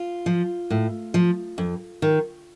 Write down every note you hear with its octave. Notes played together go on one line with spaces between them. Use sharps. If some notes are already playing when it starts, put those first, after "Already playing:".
Already playing: F4
F3
A2
F3
F2
D#3